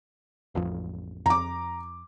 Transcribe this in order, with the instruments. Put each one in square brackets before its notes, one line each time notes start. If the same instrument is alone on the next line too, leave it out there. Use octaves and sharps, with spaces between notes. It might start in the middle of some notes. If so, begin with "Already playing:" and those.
[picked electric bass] A1 F2 F3
[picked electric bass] F2 [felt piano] A#5 D6